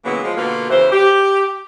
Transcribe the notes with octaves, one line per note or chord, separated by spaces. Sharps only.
C#3 E3 F#3 G#3 A#3 B3
F3 G#3 F4
B2 D3 A#3 F4 F#4 B4
E2 C#3 E3 C5
G4